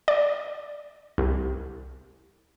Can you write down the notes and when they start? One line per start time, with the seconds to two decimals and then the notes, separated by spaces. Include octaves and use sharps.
0.08 D5
1.18 C2